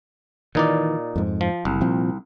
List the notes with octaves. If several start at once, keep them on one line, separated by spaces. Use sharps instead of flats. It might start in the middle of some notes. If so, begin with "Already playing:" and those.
A#2 D#3 E3 D#4 D5
F2 G#2
F3
F#1 C2
A#2 F3 C4